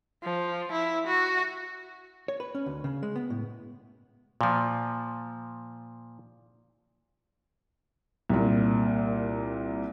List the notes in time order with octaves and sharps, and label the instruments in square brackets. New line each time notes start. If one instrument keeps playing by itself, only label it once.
[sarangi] F3
E4
F#4
[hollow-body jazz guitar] C#5
B4
C#4
D2
C#3
G#3
B3
A2
[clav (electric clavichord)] A#2 F3
[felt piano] C2 A#2